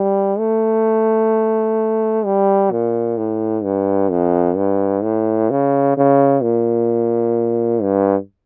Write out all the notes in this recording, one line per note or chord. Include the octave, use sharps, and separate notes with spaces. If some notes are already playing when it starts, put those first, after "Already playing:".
Already playing: G3
A3
G3
A#2
A2
G2
F2
G2
A2
C#3
C#3
A#2
G2